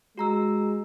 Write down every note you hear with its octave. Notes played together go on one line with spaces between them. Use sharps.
G#3 F#4 A#5 E6